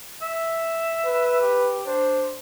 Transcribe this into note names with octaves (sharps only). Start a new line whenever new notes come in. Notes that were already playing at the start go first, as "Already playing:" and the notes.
E5
B4
G4
D4 C5